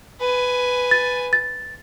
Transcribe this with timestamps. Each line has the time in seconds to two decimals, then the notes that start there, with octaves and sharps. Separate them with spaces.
0.20 B4 G#5
0.91 A6
1.33 A6